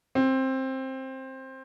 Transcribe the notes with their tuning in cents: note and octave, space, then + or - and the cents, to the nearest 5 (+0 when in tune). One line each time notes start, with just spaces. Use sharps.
C4 +15